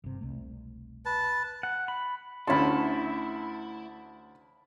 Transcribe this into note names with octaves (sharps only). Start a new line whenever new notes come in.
G1 C3
E1 C2 A3
B4 A5
F#5
B5
D2 A3 C#4 E4 A5 B5 C6